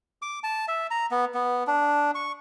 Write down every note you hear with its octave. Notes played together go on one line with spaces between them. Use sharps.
D6
A5
E5
A#5
B3
B3
D4
C#6